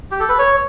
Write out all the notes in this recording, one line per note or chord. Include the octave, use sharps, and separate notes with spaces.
G4
A4
B4
C#5